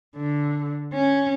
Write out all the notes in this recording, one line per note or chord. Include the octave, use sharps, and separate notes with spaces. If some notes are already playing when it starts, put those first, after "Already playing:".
D3
C#4